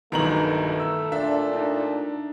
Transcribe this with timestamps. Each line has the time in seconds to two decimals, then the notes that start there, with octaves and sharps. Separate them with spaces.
0.12 B1 G2 B2 D#3 E3 A3 A#5 F#7
0.80 E6
1.12 A#2 D4 E5
1.52 D4 D#4